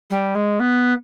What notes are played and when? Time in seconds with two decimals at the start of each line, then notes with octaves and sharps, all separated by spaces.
0.10 G3
0.34 G#3
0.59 B3